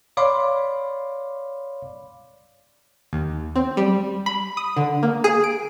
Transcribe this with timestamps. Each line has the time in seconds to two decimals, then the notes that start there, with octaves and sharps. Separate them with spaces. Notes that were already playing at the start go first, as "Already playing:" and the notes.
0.17 C#5 D5 F5 B5 C6 D6
3.13 D#2
3.56 C4
3.77 G3
4.26 B5
4.57 D#6
4.77 D3
5.03 A#3
5.24 G#4
5.44 D7